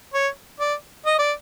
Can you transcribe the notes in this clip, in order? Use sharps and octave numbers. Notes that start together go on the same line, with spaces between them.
C#5
D5
D#5
D5